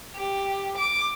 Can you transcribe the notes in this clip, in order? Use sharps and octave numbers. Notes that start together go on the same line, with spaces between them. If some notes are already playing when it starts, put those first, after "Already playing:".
G4
D6